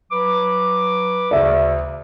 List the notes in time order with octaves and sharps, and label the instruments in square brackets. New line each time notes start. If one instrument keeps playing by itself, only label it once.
[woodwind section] F#3 B4 D6
[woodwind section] D2 C#3 [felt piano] D5 E5